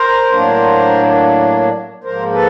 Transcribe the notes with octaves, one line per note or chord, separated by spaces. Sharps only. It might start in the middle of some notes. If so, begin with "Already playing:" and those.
Already playing: A#4 C5
A2 F#3 A#3 D4
G#2 F3 A#3 A#4 C5
A4 B4